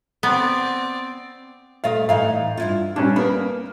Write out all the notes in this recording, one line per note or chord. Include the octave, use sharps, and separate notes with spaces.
B3 C4 D5
A#2 A3 D#5 F5
A2 E3 D#4 F5
G2 E4 F4
A#2 G3 C#4 D4
A#3 B3 B5